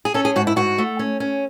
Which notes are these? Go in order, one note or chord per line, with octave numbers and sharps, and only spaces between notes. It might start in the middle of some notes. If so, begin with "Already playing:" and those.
G#4
C#4 A4
G#4
G#2 F#4
E4
G#2 F#4
A3
C#4
C#4